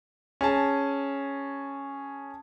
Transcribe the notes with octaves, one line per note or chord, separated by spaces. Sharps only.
C#4 G#4 A5